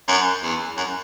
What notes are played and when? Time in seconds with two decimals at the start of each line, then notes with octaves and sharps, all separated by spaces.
0.08 F#2
0.43 E2
0.77 F#2